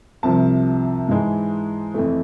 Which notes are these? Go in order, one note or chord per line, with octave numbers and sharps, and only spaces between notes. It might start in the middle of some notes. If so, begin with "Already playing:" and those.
C2 C3 F3 A5
G#2 E3 G#3
F2 E3 A3